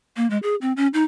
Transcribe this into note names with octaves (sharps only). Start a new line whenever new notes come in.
A#3
G#3
G#4
C4
C#4
D#4